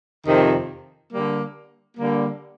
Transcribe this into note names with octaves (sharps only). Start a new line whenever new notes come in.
F2 C3 D#3
D3 G3 A#3
D3 G3 A#3